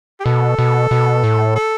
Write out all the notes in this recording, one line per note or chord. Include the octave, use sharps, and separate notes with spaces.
G4
B2 A4
B2
B2
A2
A4